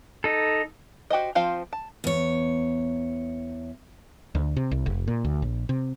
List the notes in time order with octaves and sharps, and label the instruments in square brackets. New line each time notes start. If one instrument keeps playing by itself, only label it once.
[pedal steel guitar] D#4 A4
[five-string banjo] F#4 G4 C5 D#5
F3 C4 F4 C5 F5
A5
[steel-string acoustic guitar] E2 C#5
[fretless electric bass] D2
C3
C2
F1
A#2
D2
A#1
C3